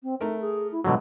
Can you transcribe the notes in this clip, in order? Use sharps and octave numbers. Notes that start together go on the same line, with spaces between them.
C4
A3 D#4 A#4
G#4
E4
B2 D3 F#3 G#3